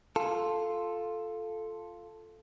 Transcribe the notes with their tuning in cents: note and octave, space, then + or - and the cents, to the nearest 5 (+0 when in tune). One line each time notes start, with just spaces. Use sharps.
F4 +0 A4 +0